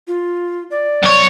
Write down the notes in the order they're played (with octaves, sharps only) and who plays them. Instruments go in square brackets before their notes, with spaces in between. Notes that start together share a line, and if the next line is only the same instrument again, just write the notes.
[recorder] F4
D5
[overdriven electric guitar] B1 C#5